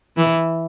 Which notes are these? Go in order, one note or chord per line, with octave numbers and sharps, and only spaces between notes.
E3